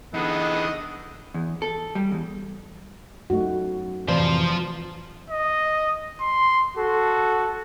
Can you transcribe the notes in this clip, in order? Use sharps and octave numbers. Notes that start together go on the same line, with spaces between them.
E3 B3 D4 D#4 G#4 A4 D#5
E2
A4
G3
E2
F#2 A3 D#4 F#4
F2 A2 C3 E3 F3 B4 C5 D5
D#5
C6
F#4 A4